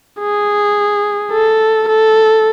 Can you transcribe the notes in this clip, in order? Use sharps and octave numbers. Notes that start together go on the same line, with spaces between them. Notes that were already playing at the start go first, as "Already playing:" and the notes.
G#4
A4
A4